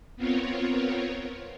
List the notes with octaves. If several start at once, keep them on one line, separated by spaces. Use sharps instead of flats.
B3 C4 F4 A#4 C#5